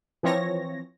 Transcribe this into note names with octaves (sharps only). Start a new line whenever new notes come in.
E3 F3 C4 C#5 A#6